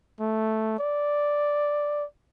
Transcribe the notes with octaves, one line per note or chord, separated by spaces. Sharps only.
A3
D5